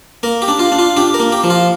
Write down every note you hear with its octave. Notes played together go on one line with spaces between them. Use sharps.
A#3 A#4
G4
D4
F4
D4
F4
D4 G4
A#4
A#3
G4
F3
F4